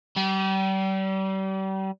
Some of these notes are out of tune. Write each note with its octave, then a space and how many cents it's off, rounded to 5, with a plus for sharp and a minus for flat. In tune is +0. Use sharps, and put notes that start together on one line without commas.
G3 -35